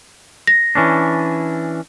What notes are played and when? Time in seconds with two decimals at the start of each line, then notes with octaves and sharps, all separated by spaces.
0.47 A#6
0.75 E3 C#4 D4